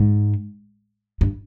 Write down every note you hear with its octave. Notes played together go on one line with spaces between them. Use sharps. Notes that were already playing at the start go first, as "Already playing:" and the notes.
Already playing: G#2
G2